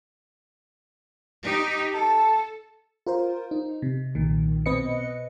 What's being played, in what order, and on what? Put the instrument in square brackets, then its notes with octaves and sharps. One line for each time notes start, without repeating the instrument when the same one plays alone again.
[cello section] D#4 G4
[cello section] A4 [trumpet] A5
[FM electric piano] F4 A#4 C5
D#4
C3
B1 A#2 D#3
B2 C4 B4 D#5 C#7